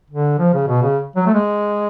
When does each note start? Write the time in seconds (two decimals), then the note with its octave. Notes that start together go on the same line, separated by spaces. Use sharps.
0.10 D3
0.39 F3
0.54 C#3
0.67 B2
0.83 C#3
1.16 F#3
1.27 A3
1.34 G#3